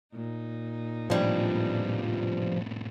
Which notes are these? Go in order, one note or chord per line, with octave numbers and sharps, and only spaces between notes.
A#2 D#4
A2 C3 E3 F3 G3 D4